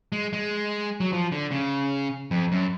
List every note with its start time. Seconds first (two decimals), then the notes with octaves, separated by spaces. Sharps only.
0.12 G#3
0.33 G#3
1.00 F#3
1.13 F3
1.32 D3
1.51 C#3
2.31 F2
2.52 F#2